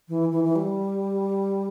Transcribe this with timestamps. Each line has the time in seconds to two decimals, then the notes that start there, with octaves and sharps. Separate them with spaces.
0.09 E3
0.32 E3
0.44 E3
0.56 G3